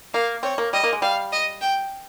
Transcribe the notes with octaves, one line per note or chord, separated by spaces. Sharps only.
A#3 F5
C4 C#5
A#3
G3 D#5
A#3
G#3
G3 F5
D#5
G5